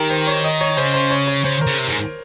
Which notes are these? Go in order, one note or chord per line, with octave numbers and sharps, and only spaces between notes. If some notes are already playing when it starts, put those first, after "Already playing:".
Already playing: D#3 G4 A#4
C5
C#5
D#5
C#5
C#3 C5
C5
C#5
C#5
C#3 C5
A#4
C#3
C3
G#2